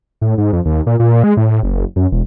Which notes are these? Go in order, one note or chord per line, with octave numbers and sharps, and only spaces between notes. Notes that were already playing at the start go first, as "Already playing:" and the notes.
A2
G#2
F2
D#2
A#2
A#2
G#3
A2
F#1
F#2
E1